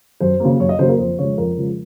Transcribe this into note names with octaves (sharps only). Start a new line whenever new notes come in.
F#2 C5
C#3 F#3 A#3
F#2 C#5
D#5
C#3 F#3 A#3 C5
A#4
F2 C5
C#3 F3 G#3 C#5
F2 A#4
C#3 F3 G#3